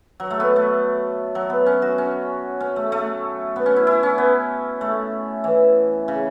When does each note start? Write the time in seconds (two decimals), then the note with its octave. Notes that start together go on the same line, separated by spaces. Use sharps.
0.20 F#3
0.30 A3
0.40 B3
0.56 A3
1.35 F#3
1.50 B3
1.66 C#4
1.82 F#4
1.98 C#4
2.60 C#4
2.76 A3
2.92 A3
3.56 B3
3.66 C#4
3.76 E4
3.87 E4
4.03 C#4
4.18 B3
4.81 A3
5.44 E3
6.08 C#3